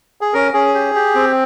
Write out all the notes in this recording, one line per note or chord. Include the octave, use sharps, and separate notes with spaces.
G#4
C#4 A#4
C#4 G#4
G4
G4
C4